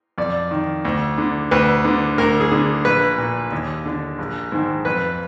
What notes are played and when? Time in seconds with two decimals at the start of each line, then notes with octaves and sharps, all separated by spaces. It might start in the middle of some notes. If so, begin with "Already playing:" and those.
0.18 F2 D5
0.51 D#3
0.85 D2
1.18 D3
1.51 D2 B4
1.85 D3
2.18 D2 A#4
2.40 G#4
2.52 D3
2.85 A#1 B4
3.18 A#2
3.52 D#2
3.86 D3
4.19 A#1
4.52 G#2 D#3
4.85 F2 B4